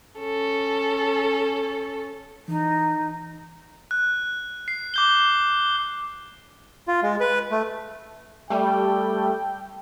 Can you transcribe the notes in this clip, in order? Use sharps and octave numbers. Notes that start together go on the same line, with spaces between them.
C#4 A4
E3 D#4
F#6
C7
D6 G6 G7
F4
G#3
B4
A3
G3 A3 G5